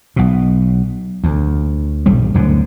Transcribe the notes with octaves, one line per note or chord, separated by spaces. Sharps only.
B1 B2
D2
D#1 B1 G2 G3
D1 F#2 D3